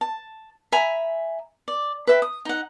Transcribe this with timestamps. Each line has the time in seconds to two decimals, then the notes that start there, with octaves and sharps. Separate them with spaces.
0.01 A5
0.72 E5 G#5 A#5 B5
1.68 D5
2.07 B4 E5 G5
2.22 D#6
2.45 D#4 F#5